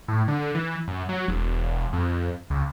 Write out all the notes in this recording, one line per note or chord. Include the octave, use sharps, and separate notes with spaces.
A2
D3
E3
F#2
F#3
E1
F2
C#2